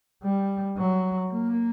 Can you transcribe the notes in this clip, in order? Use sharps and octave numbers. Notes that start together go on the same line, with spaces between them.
G3
F#3
A#3